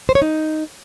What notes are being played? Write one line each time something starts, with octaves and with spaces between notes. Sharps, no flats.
C5
C#5
D#4